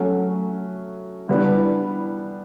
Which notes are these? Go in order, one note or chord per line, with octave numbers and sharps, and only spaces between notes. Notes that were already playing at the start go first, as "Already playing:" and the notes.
Already playing: F#3 A3 C#4 F#4
E3 G3 B3 D4